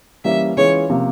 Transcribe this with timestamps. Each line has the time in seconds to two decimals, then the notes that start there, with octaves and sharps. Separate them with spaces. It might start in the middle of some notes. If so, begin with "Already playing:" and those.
0.24 E3 G3 A#3 C#4 E5
0.57 E3 G#3 C#4 F4 G#4 C#5
0.90 C3 F3 A#3 C#4